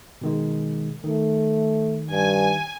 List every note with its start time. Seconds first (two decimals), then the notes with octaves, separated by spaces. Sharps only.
0.22 B2 D#3 G#3
1.04 D#3 A3
2.11 G2 G#5